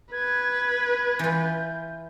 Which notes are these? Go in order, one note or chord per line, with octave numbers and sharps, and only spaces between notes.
B4 G#6
E3 F4 G6